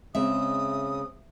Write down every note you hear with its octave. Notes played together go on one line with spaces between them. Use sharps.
C#3 G#3 C4 D#5 E5 D#6